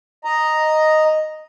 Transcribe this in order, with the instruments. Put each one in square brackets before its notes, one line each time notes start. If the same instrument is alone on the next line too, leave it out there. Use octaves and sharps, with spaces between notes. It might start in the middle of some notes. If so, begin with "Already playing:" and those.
[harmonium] D#5 A#5